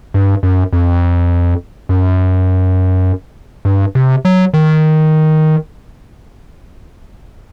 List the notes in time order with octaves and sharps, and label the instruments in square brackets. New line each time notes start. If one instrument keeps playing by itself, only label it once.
[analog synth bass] G2
F#2
F2
F#2
G2
C3
F#3
D#3